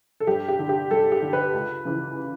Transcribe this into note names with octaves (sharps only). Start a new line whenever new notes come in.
A4
G2 G4
G4
D3
G4
G2 A4
G4
D3
B4
C#2
C#3 E3